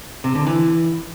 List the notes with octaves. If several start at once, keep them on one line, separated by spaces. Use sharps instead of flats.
C3
D3
E3